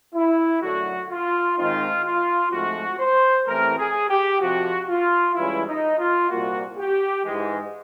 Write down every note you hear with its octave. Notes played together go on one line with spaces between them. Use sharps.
E4
F#2 D3 F#3 A3 F#4
F4
G#2 D#3 G#3 C4 D#4 F4
F4
G#2 F3 A3 C4 F#4
C5
A1 A2 E3 A3 C4 A#4
G#4
G4
F2 C3 F3 F#4
F4
G2 E3 G#3 C#4 E4
D#4
F4
C2 A#2 G3 A#3 F#4
G4
G#2 E3 G#3